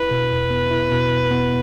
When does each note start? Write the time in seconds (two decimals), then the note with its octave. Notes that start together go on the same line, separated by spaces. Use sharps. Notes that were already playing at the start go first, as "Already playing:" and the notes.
Already playing: E4 B4
0.11 B2
0.31 E2
0.50 B3
0.71 E4
0.91 B2
1.11 E2
1.31 B3